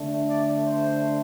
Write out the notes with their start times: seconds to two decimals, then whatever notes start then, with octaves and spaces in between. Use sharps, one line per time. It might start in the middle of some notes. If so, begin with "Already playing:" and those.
Already playing: D3 A3 D4
0.30 D5
0.67 C5